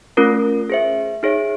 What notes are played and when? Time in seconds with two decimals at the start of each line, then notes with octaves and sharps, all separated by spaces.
0.17 A3 C#4 F4 A#4
0.70 G#4 C5 E5
1.23 D#4 G#4 C#5 E5